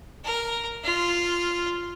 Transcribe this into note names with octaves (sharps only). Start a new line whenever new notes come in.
A#4
F4